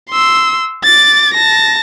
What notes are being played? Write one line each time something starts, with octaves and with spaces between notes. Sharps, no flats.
C6 E6
D6 A6
A5 A#6